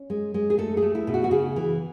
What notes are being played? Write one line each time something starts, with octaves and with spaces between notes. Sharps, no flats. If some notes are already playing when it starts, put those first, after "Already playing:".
Already playing: C#4
G#3
G#3
G#4
A3 A4
G#4
A3
E4
B2
F#4
F#4
C#3 G#4
E3